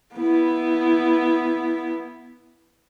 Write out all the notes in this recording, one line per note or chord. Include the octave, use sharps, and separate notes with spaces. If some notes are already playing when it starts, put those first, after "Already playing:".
B3 E4